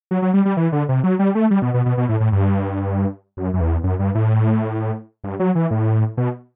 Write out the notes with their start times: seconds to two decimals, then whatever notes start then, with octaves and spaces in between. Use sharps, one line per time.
0.11 F#3
0.22 F#3
0.34 G3
0.45 G3
0.57 E3
0.72 D3
0.89 C3
1.04 F#3
1.19 G3
1.35 A3
1.51 G3
1.62 B2
1.74 B2
1.86 B2
1.97 B2
2.09 A2
2.20 A2
2.32 G2
3.37 F#2
3.53 F#2
3.61 E2
3.84 F#2
3.99 G2
4.15 A2
5.24 G2
5.40 F#3
5.55 E3
5.71 A2
6.17 B2